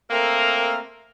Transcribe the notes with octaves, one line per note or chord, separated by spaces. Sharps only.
A3 A#3 C4 A#4